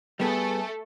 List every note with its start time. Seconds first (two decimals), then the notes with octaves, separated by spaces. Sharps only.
0.20 G3 A3 B3 G#4 A4